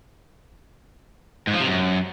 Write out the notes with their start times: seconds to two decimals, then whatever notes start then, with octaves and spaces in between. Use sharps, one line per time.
1.47 G#2
1.54 F3
1.60 C3
1.67 F#2